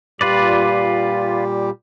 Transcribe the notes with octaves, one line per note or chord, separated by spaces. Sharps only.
A#2 G3 F4 G4 B4 D5